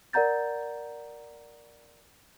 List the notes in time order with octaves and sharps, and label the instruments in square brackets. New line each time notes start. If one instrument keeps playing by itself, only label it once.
[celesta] A#4 D5 F#5 A#5 G6 A6